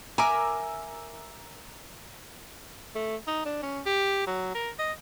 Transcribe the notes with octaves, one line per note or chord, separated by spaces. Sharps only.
A#4 E5 G#5 D6
A3
D#4
D4
C#4
G4
F#3
A#4
D#5